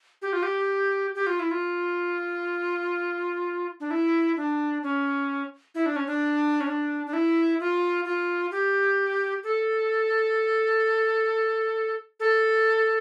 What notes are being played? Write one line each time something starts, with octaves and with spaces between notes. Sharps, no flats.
G4
F4
G4
G4
F4
E4
F4
D4
E4
D4
C#4
E4
D4
C#4
D4
C#4
D4
D4
E4
F4
F4
G4
A4
A4